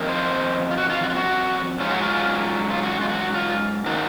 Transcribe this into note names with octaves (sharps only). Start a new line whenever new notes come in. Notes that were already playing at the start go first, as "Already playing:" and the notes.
Already playing: F2 D#3 A#3
C5
F4
F#4
F4
F#4
F4
F#4
G#2 F#3 C#4 F4
F#4
F4
F4
F#4
F4
F#4
F4
D#3 A#3 D#4 F#4